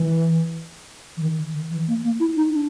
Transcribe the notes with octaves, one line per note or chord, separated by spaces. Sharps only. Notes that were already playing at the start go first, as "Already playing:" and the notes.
Already playing: E3
E3
D#3
D#3
D#3
E3
A#3
A#3
E4
D#4
D4